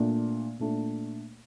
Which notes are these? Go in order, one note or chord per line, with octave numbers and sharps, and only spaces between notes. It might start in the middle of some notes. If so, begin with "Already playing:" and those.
Already playing: A#2 A3 D4
A#2 A3 D4